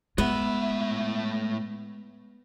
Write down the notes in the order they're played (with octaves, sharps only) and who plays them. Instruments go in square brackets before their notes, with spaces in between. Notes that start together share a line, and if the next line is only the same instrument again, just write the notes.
[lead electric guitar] A2 E5 [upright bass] G#3 [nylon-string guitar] B3